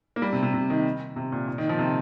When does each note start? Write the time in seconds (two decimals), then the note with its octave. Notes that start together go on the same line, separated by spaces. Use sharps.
0.16 A#3
0.22 G3
0.33 C3
0.43 C3
0.54 C3
0.70 D#3
1.16 C3
1.32 A#2
1.48 A#2
1.58 D#3
1.69 F3
1.79 C3